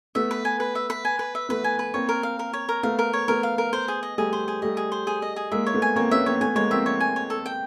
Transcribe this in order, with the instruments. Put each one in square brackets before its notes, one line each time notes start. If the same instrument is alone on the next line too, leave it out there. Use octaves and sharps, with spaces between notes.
[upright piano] A3 B3 [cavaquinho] E5
[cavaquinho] B4
G#5
B4
E5
B4
G#5
B4
E5
[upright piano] A3 B3 [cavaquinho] B4
[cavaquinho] G#5
B4
[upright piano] A#3 C4 [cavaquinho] C#5
[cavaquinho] A#4
F5
A#4
C#5
A#4
[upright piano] A3 B3 [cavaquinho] F5
[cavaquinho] A#4
C#5
[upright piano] A3 B3 [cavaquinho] A#4
[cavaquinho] F5
A#4
C5
G#4
D#5
[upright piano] G3 A3 [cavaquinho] G#4
[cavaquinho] C5
G#4
[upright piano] G3 A3 [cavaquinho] D#5
[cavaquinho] G#4
C5
G#4
D#5
G#4
[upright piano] G#3 A#3 [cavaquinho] E5
[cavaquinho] C#5
[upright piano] A3 B3
[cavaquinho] G#5
[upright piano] A#3 C4 [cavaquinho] C#5
[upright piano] B3 C#4 [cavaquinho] E5
[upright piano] A#3 C4 [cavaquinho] C#5
[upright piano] A3 B3 [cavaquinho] G#5
[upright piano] G#3 A#3 [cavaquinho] C#5
[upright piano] A#3 C4 [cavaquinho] E5
[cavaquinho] C#5
G#5
C#5
A4
G5